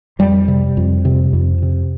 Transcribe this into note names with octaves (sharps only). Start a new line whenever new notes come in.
F2 G3
C3
F2
C3
F2
C3